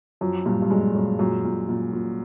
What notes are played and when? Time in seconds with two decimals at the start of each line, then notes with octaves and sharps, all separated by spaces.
0.21 F#2 F3
0.46 G2 A#2
0.62 G2
0.70 F#2 G#3
0.95 F#2 A#2
1.19 F#2 A#2
1.44 A#2
1.69 A#2
1.93 A#2